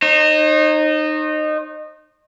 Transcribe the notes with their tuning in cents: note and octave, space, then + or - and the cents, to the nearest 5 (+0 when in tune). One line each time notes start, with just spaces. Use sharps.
D#4 -20 C5 +45